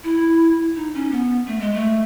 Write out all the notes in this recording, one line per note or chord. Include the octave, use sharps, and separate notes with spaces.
E4
D#4
C#4
B3
A3
G#3
A3